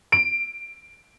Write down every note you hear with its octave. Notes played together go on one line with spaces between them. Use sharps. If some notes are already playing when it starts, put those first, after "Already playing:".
D7